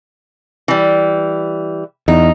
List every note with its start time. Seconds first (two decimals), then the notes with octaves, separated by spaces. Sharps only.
0.68 E3 G3
2.08 E2 D#4